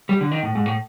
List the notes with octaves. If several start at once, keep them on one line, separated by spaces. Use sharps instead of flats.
G3
D3
D#3
A2
G#2
A2